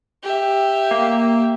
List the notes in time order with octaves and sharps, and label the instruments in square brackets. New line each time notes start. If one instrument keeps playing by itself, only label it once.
[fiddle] G4 E5
[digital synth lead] A#3